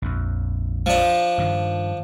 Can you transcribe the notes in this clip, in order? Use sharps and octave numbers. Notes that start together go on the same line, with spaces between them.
A#1 F2
F3 D4
G2 D#3